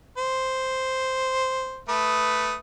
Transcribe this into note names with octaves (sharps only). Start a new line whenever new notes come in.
C5
A3 B4 D#6